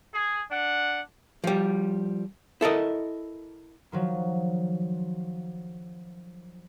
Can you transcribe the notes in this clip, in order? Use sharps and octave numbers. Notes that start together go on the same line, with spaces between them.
G#4
D4 F#5
F3 G3
E4 A4 A#4 D#5
D#3 F3 F#3